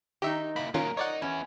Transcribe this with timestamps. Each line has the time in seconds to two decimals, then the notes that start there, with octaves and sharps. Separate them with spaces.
0.22 D#3 D#4 G4 E5
0.56 A#3 E4 B5
0.74 D#3 F#3 A#3 C#4 F4 A#4
0.97 D#4 C#5 D5 F#5
1.22 B3 C#4 E4